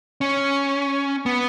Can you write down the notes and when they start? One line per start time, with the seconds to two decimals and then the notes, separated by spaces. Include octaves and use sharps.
0.21 C#4
1.26 B3